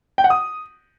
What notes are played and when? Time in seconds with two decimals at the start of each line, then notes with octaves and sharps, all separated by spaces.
0.18 G5
0.24 F#5
0.30 D#6